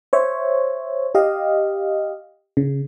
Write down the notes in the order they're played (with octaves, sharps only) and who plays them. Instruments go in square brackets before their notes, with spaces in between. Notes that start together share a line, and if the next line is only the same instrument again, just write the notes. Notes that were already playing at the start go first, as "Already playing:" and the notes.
[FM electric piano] C5 C#5 E5
G4 D#5 F5
C#3